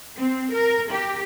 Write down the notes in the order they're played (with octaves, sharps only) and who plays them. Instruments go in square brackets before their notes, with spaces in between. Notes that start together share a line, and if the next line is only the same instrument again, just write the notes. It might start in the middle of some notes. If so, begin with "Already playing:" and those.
[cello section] C4
A#4
G4